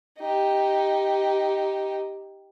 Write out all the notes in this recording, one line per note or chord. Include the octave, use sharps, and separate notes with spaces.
D#4 G4